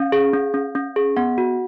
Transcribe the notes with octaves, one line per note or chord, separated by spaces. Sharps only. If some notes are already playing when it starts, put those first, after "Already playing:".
Already playing: C#4 F5
G#4
C#4
C#4
C#4
G#4
B3 F#5
F#4